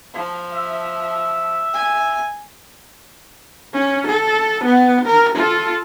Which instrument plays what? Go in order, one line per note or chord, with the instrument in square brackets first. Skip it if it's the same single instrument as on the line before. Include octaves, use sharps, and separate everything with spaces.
[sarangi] F3
[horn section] E5
[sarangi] G#5
[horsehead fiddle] C#4
A4
B3
A#4
F4 A4